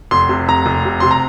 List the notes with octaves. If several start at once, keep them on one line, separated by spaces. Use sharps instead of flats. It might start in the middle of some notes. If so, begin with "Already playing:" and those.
F1 C6
C3
F1 A#5
F1
C3
C3 C6
A#5